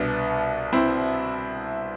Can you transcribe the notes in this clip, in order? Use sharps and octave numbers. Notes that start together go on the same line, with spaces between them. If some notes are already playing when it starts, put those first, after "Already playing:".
Already playing: C2 B2 B3 D4
C4 E4